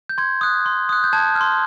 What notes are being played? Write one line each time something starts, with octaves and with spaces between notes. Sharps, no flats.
G6
C6 G#6
D#6 F#6
C6
D#6 F#6
G6
A5 G#6
F6
C6